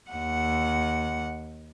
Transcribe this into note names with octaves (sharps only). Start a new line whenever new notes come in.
D#2 F#5